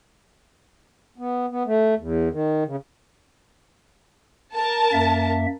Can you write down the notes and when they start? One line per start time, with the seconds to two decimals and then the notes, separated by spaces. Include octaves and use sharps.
1.18 B3
1.50 B3
1.66 A3
1.97 E2
2.32 D#3
2.65 C#3
4.53 A#4 A5
4.93 F#2 A#3 E5